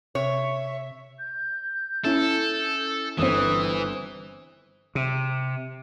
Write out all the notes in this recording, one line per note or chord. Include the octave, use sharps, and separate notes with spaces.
C3 C#5 E5
G6
C#4 E4 A4
G1 E3 C4 D#6
C3